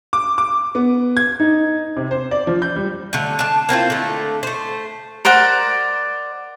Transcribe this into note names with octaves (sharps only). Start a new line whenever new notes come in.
D6
D6
B3
G#6
D#4
C3
C5
D5
F3
G6
G3
D3 A3
D4 A5
A#3 C4 E4 F4
D3 A3
A3 C5
A#4 C5 D5 F#5